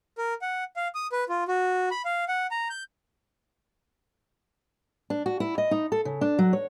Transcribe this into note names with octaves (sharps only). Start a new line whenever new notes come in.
A#4
F#5
F5
D#6
B4
F4
F#4
B5
F5
F#5
A#5
G6
D4
F#4
E4
D#5
D#4
A4
C#3
D4
F#3
C#5